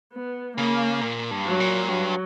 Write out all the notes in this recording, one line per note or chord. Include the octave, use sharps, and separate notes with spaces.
B3
C#3 A#3
A#2
G2
F#3
A#2
G2 F#3